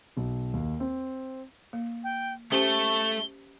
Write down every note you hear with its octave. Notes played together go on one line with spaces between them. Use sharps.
B1
D#2
C4
A#3
G5
A3 C#4 G4 C5 G7